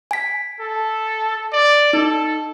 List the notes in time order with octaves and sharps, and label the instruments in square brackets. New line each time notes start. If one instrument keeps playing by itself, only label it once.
[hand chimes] G#5 B6
[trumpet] A4
D5
[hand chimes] D#4 [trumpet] A4